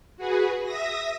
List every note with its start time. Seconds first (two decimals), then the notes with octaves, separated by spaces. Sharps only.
0.17 F#4 G#4 B4
0.64 E5 D#6 A#6